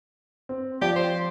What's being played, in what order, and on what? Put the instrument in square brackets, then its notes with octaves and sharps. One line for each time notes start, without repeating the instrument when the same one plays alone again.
[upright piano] C4
[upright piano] F3 D5 [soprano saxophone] G4
[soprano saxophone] C5